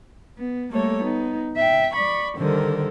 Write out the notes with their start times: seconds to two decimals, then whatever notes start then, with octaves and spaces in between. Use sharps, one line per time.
0.37 B3
0.72 G3 A3 A#3 A4 C#5
1.02 B3 D#4
1.56 E5 G5
1.94 D5 B5 C#6
2.36 D3 D#3 G3 A4 A#4 C5